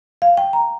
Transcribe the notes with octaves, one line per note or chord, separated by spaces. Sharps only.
F5
G5
A#5